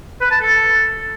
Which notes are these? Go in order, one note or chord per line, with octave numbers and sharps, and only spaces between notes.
B4
A5
A4